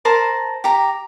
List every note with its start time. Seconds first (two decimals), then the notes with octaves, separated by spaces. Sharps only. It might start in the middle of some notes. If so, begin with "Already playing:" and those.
0.05 A#4 C5 A5 B5
0.64 G4 A#5